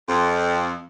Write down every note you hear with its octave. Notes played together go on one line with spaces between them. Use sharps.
F2